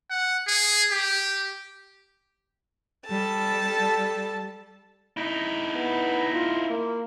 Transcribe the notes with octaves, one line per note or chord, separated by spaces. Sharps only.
F#5
G#4
G4
G3 A4 A5
D#4 E4
B3
F4
A#3